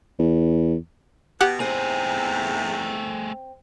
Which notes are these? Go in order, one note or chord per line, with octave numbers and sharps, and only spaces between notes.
E2
B2 G4 F#5
E2 G#2 C3 A3 C4 G#4